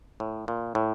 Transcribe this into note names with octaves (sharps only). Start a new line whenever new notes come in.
A2
A#2
A2